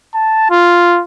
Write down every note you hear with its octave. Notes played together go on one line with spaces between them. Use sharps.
A5
F4